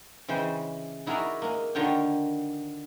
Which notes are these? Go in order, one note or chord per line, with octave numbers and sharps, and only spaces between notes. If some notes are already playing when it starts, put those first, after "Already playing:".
C#3 E3 G#3 C5 G5
D#4 E4 F#4 G#4 A#4 D5
G#3 A#3
D3 D#3 F4 C#5 D#5 G5